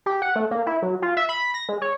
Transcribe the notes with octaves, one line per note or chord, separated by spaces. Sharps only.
G4
F#5
A3
A#3
E4
F#3
F4
E5
B5
A#6
G#3
C#5